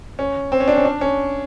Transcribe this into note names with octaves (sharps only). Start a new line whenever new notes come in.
C#4
C4
C#4
D4
C#4
D4
C#4